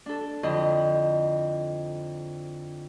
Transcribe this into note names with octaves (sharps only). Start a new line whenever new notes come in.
D4 A4
F2 D3 E4 D#5